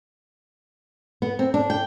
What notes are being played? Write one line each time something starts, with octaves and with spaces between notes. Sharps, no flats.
B3
C4
D4
G5